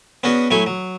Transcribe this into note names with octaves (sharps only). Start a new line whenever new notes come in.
B3 C#4 D4 F#4 G#4
F#3 A3 E4 A4 G#5
F#3